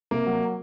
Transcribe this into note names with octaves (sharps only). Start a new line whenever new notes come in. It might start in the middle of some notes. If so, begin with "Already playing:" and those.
C3 A#3
F#3